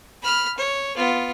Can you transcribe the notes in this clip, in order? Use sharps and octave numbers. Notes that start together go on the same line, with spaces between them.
B5 F6
C#5
B3 F4